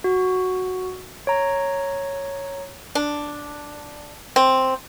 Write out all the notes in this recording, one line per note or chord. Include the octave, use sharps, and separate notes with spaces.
F#4
C#5 A#5
D4
C4